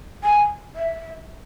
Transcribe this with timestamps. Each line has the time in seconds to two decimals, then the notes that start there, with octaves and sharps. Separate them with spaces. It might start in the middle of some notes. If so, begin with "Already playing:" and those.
0.24 G#5
0.76 E5